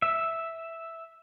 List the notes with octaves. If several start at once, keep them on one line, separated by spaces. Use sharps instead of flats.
E5